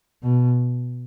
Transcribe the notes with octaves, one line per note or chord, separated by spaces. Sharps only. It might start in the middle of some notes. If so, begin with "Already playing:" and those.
B2